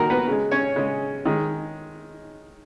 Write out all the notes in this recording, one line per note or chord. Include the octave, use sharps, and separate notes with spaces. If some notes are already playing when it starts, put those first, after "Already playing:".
Already playing: D#3 A#3 F#4 A#4 A#5
B3 B4
C#3 G#3
C#4 C#5
C#3 G#3
D#3 G#3